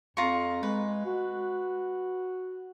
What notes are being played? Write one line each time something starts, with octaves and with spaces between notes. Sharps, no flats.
F2 F4 A#5 C#6
G#3 B4
F#4